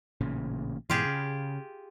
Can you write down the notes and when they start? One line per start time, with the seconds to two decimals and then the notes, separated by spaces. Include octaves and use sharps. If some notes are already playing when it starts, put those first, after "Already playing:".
0.21 A1 A#2 C#3
0.90 G#2 B2 E3 F4 G4 G#4
1.05 C#3